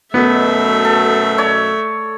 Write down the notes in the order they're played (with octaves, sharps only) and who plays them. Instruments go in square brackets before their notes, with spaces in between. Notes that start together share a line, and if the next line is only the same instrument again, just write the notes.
[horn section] F#2 B2 [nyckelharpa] A3 E5 [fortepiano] B3
[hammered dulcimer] A4
C#5 D5